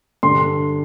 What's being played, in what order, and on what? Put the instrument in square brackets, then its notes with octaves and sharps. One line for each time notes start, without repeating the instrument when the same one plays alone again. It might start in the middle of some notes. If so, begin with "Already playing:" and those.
[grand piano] G2 D3 C6